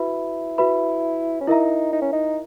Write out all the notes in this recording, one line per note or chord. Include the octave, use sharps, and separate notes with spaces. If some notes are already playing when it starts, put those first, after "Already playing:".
Already playing: E4 F#4 B4 E5 B5
F#4 B4 E5 B5
C#4
D#4 E4 A#4 E5 A#5
D#4
C#4
D#4